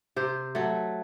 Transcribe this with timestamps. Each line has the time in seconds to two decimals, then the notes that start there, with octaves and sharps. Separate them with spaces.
0.16 C3 C5
0.55 F#3 A3